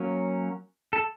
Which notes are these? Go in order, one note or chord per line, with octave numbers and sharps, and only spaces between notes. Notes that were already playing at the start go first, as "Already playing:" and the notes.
Already playing: F#3 A#3 C#4
A4